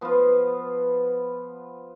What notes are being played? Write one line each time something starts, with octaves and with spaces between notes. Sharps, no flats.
F3 B3 F4